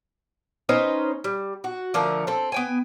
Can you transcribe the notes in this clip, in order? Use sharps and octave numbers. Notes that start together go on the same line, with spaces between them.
C#4 D#4 B4 C5
G3
F#4
D3 F3 A3 A#4
C4 A4
B3 G5 G#5